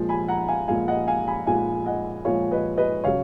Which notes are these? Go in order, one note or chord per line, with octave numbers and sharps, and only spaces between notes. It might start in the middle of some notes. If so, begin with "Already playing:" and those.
Already playing: A#2 F3 G#3
G#5 B5
F#5 A#5
F5 G#5
A#2 F3 G#3 F5 G#5
D#5 F#5
F5 G#5
G#5 B5
A#2 F3 G#3 F5 G#5
D#5 F#5
A#2 F3 G#3 C#5 F5
B4 D#5
B4 D#5
C#3 F#3 C#5 F5